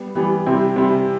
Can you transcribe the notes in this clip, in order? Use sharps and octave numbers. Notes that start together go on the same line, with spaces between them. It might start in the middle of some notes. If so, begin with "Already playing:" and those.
Already playing: G3 B3
E3 G3 B3
C3 G3 C4 E4
C3 G3 C4 E4